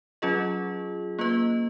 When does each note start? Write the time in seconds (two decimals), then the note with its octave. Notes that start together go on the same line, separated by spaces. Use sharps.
0.22 F#3 C#4 F4 G#4 D#5
1.19 A#3 F4 B4 D#5